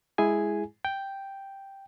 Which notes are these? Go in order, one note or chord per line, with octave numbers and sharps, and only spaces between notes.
G#3 E4 G#4 G#5
G5